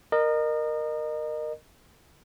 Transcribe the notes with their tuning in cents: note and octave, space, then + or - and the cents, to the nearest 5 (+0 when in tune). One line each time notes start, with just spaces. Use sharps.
A#4 +0 D#5 -30